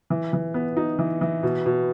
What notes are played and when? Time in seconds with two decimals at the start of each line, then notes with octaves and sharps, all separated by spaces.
0.10 E3
0.33 E3
0.54 B3
0.77 D#4
0.99 E3
1.21 E3
1.43 B2
1.66 B2